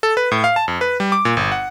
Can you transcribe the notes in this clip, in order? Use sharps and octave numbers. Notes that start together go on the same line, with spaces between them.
A4
B4
A2
F5
A5
F2
B4
G3
D6
A#2
G1
F#5